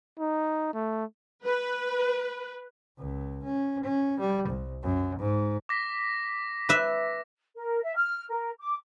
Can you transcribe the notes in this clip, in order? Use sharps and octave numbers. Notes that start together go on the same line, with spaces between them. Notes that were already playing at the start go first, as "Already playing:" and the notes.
D#4
A3
B4
C#2
C#4
C#4
G3
C2
F#2
G#2
D6 A#6 B6
B4 E5
A#4
E5
F6
A#4
D6